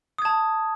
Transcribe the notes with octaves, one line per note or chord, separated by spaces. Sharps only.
A5 D#6 G#6